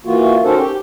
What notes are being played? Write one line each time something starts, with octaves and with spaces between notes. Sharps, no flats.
E3 A#3 F4 F#4
C#4 D#4 F#4 A4 A#4 C5
G4 G5